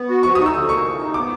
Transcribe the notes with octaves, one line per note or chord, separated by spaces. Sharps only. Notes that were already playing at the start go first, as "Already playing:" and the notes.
Already playing: B3
F#4
F3 C#6
D#6
D#4
E6
D3
A#3 C#6
F3
D#4
B3 D6